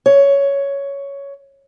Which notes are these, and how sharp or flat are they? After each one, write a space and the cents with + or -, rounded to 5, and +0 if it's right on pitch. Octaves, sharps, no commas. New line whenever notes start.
C#5 +10